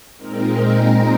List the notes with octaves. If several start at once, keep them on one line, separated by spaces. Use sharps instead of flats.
A#2 G#3 C4 D#4 A#4